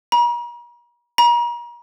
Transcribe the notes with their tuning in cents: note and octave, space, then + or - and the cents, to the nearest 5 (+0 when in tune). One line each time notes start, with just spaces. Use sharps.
A#5 +45
A#5 +40